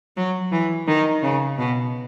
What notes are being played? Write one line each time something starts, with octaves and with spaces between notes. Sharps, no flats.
F#3
E3
D#3
C#3
B2